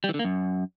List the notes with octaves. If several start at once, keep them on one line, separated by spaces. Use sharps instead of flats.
G3
E3
D3
A#3
F#2